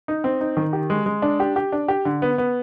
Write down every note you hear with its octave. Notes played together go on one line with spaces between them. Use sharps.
D#4
C4
D#4
D#3
G4
G#3
G#3
D4
G4
G4
D4
G4
D3
B3
B3